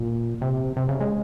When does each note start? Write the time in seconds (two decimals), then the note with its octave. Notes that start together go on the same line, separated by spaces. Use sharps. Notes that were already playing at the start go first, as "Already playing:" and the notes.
Already playing: A#2
0.41 C3
0.77 C3
0.89 C#3
1.00 G#3